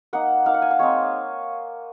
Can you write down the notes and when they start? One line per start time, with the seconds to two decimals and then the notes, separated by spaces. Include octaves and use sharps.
0.13 A#3 D#4 F#5
0.46 A#3 D#4 F5
0.54 F#5
0.62 G#5
0.71 F5
0.79 G#3 C4 D#4 C#5